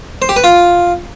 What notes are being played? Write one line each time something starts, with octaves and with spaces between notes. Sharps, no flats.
C5
G4
B4
F4